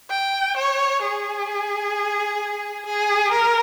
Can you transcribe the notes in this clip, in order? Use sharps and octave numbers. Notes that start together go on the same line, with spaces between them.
G5
C#5
G#4
G#4
A#4